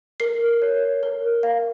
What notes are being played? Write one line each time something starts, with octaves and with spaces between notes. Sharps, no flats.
A#4 C7
C#5
A#4
F5